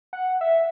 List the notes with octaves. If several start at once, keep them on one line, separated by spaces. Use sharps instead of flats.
F#5
E5